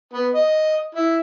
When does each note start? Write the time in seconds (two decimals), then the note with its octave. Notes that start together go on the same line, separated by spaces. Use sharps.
0.13 B3
0.34 D#5
0.94 E4